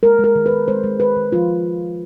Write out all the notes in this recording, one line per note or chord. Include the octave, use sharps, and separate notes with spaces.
G#3 A#4
G#3 A#4
D#3
B4
D#3
G#3 C5
G#3
D#3 B4
D#3
F3 F4